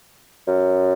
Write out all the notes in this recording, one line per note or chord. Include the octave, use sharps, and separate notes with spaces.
F#2